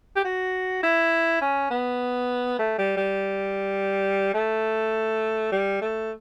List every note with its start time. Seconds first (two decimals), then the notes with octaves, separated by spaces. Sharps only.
0.16 G4
0.25 F#4
0.83 E4
1.41 C#4
1.71 B3
2.59 A3
2.78 G3
2.97 G3
4.34 A3
5.52 G3
5.81 A3